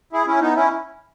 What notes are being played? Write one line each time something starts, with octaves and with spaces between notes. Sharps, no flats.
E4 G#4
C#4 E4
B3 D#4
C#4 E4